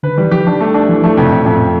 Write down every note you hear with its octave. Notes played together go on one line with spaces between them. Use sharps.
D3 B4
E3 G3
F3 G4
D4
A3
D4
E3 F3
F3 A3
F2 C3
F2 B2
F2 A2